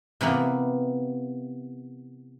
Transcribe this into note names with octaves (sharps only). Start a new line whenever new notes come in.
C3 E3 A#3 B3